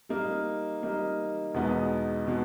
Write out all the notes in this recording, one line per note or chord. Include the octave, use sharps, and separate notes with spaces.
G3 A#3 D#4
G3 A#3 D#4
E2 B2 G#3 B3 D#4
B2 G#3 B3